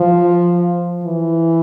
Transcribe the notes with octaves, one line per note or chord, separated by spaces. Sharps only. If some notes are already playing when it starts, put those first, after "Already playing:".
Already playing: F3
E3